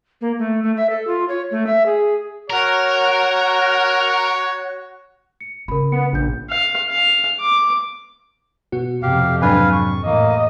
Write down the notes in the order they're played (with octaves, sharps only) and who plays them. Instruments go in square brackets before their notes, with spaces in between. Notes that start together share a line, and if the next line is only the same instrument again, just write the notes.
[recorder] A#3
A3
A3
E5
A4
F4
C#5
A3
E5
G#4
[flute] F#4 [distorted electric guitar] A#4 [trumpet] C#5
[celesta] C#7
[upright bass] C#3 [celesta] A#4 B5
[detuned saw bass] B3 [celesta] C#7
[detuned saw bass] A#1 [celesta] D4 G6
[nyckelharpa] F5
F5
D6
[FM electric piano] B2 B3 F#4
[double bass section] F2 C3 [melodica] G4 F5
[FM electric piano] G#2 F#3 D4 [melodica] B4 F5 G#5
[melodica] C#6
[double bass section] A2 [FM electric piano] E3 [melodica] A#3 [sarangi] D#5